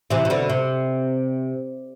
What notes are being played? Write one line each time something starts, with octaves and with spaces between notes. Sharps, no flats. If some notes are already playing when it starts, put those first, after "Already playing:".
C3 E3
C3
B2 D3
C3